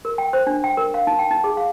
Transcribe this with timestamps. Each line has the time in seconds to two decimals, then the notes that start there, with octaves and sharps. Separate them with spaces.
0.05 A#4
0.18 G5
0.33 C5
0.47 D4
0.64 G5
0.77 A#4
0.94 F5
1.07 D#4
1.19 G5
1.31 D#4
1.44 G#4
1.57 F5